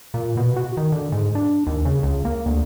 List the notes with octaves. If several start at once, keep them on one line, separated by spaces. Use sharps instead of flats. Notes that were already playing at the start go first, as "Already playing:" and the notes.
A#2
B2
F#4
D#3
D3
G#2
D4
D#2
C#3
C#2
A#3
D2